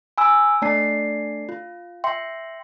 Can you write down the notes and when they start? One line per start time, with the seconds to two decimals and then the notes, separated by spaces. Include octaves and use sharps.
0.18 G#5 B5 E6
0.62 A3 D4 D5 A5 C7
1.49 F4
2.04 E5 G5 C6